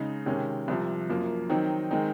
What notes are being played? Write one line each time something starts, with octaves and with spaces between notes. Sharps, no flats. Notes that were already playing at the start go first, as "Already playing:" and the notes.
Already playing: C#3 G#3 D#4
C3 D#3 G#3 C#4
C2 C3 F3
F#2 F3 A#3
D#3 F#3 C4 D#4
D#3 G#3 C4 D#4